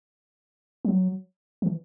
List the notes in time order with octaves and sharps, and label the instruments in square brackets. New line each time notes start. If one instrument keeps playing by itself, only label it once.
[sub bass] F#3
E3